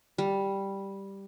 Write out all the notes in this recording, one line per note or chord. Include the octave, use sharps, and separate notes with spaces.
G3